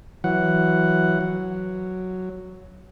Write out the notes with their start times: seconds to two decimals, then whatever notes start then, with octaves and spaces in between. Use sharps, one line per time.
0.24 E3 F#3 F#5
1.21 F#3